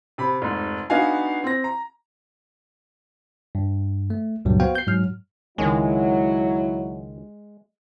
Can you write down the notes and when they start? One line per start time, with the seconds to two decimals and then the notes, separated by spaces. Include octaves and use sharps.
0.18 C3 B5
0.42 F1 G#2
0.90 B3 D4 D#4 F#4 F5 G#5
1.44 C4 A#6
1.64 A#5
3.55 G2
4.10 A3
4.45 C#2 G2 A#2 F#3 G3
4.60 B3 F#4 C5 F5 G5
4.75 G6 C7
4.87 G#2 F#3 F6
5.58 C#2 D#3 F#3 G#3 C#4 E4